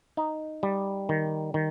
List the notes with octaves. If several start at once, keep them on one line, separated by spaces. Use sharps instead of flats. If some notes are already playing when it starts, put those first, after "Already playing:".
D#4
G3
D#3
D#3